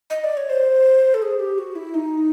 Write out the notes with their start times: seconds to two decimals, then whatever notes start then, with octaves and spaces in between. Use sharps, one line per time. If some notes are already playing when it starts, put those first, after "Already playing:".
0.10 D#5
0.24 D5
0.37 C#5
0.49 C5
1.14 A4
1.22 G#4
1.39 G4
1.58 F#4
1.75 E4
1.94 D#4